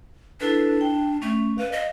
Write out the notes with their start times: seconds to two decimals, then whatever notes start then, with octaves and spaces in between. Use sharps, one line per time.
0.41 D4 E4 A4 B4
0.81 G5
1.22 A3 C#4
1.58 B4 F5
1.72 D#5